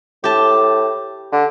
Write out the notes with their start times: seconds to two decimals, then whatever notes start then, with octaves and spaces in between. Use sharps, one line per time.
0.24 A2 G4 A5
1.32 D3